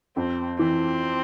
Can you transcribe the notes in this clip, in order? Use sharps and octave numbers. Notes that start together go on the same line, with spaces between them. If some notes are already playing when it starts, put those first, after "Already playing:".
F2 C4
E3 C4